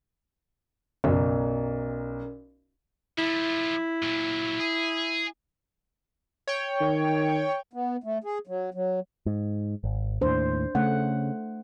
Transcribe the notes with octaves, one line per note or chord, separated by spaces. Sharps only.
B1 F#2 C#3 C#4 A#4 D5
F3 A3 E4
A#2 F#3
G#4
C#5 G5
D#3
B3
A3
G#4
F#3
F#3
G#2
G#1
D#2 A2 D4 C5
C#3 A3 F#5